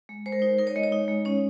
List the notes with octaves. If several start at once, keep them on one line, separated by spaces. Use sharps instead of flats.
G#3
G#3 C5
A#4
D#4 C5
D#4 A#4
C#5
G#3 D#5
C#5
D#4
G#3
C#4 C#5